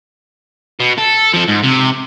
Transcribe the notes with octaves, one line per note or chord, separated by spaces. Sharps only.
B2
A4
F3 A4
G#2
C3